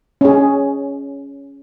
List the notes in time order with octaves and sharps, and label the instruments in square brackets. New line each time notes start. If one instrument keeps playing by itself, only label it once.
[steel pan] C#4 G#4